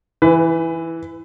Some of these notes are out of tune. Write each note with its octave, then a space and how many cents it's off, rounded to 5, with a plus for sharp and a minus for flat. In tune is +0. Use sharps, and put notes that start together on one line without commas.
E3 +0 B4 +30